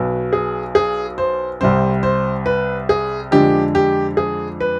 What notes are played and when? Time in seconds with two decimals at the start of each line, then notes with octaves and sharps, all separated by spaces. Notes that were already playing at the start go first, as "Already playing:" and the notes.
Already playing: B1 B2 B3
0.33 G#4
0.75 G#4
1.18 C5
1.61 C2 C3 G3 C4 C5
2.03 C5
2.46 B4
2.89 G#4
3.31 F2 D3 G#3 D4 G4
3.75 G4
4.17 G#4
4.61 B4